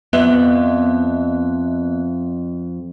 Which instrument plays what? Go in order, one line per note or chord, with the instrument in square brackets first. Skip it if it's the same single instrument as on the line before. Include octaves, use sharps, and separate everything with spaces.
[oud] F2 [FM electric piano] B3 E5